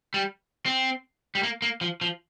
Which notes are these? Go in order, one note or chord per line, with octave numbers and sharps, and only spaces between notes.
G3
C4
G3
A#3
A#3
F3
F3